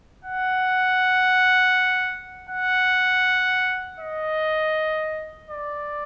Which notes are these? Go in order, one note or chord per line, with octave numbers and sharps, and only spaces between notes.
F#5
F#5
D#5
D5